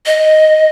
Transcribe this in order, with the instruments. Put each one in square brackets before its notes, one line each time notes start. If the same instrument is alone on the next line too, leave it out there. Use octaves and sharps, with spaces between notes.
[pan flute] D#5